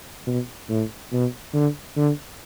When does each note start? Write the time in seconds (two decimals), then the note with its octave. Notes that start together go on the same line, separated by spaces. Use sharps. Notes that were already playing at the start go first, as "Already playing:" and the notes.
0.27 B2
0.69 A2
1.12 B2
1.54 D3
1.97 D3